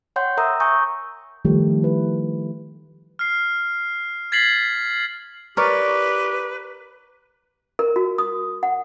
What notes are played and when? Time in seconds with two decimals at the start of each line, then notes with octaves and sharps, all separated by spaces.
0.16 C#5 F#5 G5 C6 G6
0.37 A#4 E5 A#5 D#6 E6
0.60 G#5 A#5 C#6 D#6 G6
1.45 D#3 F3 G3 A3 G4 A4
1.83 E4 B4
3.19 F6 C7
4.32 G#6 A6 B6 C7 F#7
5.57 G4 A#4 B4 C#5 D5
7.79 A#4
7.96 F#4
8.18 D#6
8.63 F#5